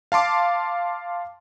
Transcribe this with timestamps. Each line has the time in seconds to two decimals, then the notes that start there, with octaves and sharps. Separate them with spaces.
0.12 F5 A5 C6 D6